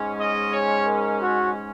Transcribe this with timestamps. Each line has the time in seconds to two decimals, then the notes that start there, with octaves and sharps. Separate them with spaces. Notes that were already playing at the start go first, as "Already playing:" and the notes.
Already playing: G#2 G#3 C#4
0.19 D#5
0.52 C#5
0.84 A#4
1.17 F#4